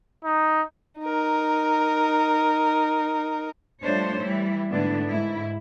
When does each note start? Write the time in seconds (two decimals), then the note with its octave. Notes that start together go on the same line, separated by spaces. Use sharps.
0.24 D#4
0.99 D#4 A#4
3.82 F3 G3 A3 D4 C5 C#5
4.20 E3 G3 E4
4.71 G#2 D3 A3 B3 D4 E4
5.08 G#2 E4